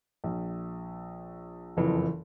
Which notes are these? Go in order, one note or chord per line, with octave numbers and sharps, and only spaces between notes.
A#1
F#1 F2 E3